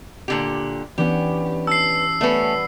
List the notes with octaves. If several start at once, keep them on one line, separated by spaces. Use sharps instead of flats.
A#2 D3 G4
E3 B3 C#4 D4 G4
A5 E6 C7
G3 A3 B3 C#4 B4